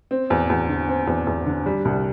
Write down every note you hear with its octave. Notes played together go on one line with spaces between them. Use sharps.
C4
E2
E2
D3
C4
E2
E2
D3
G3
C2